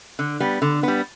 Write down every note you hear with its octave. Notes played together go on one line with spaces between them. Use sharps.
D3
G3 B3
D3
G3 B3